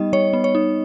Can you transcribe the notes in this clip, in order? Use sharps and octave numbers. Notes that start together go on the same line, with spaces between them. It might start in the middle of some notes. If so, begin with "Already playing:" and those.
Already playing: G3 B3 D#4 D#5
G3 C#5
B3
C#5
D#4